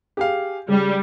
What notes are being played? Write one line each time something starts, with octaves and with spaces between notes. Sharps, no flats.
G4 G#4 F5
C#3 G3